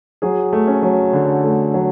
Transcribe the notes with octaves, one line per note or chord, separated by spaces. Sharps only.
F#3 G#4
A3
C#4
F#3
D3
A3
F#3